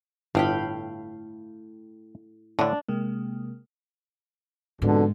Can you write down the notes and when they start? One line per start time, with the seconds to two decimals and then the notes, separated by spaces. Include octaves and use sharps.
0.35 G1 A2 A3 F5 G5 B5
2.59 A2 D3 D4
2.89 C3 G#3 A#3
4.82 F2 G#2 B2 D3